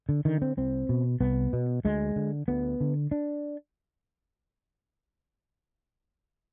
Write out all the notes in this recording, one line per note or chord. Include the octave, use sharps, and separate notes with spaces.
D3
D3 D#3
C4
C2 C4
B2
C2 B3
B2
D2 G#3
D3
D2 B3
D3
D4